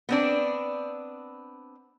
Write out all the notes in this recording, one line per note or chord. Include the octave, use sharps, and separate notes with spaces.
B3 C4 D4